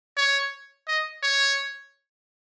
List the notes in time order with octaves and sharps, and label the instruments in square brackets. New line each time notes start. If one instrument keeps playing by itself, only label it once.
[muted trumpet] C#5
D#5
C#5